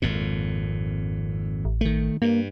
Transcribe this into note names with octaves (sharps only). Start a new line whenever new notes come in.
G#1 F2 A#2
A1
D#3 A3
G2 A#3